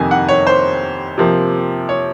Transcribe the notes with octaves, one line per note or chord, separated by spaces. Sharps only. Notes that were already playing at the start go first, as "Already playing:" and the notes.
Already playing: F2 C3 D#3 A#3 G#5
F#5
C#5
C5
C3 F3 A#3
C#5